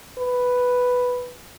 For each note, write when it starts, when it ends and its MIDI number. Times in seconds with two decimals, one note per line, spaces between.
0.19 1.33 71